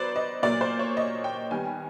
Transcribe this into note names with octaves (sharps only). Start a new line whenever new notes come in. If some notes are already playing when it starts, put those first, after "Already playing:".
Already playing: F#3 B3 B4 C5 D5
D#5
A#2 F#3 A#3 D5
C5
C#5
D#5
G5
D#3 G3 B3 G#5